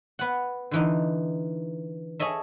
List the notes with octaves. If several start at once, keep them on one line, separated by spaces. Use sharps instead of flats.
B3 F#5
D3 E3 D#4
G#4 A4 C#5 D#5 E5